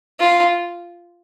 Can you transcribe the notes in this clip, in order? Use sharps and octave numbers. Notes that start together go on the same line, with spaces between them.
F4